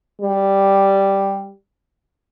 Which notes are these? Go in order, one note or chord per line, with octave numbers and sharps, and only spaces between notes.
G3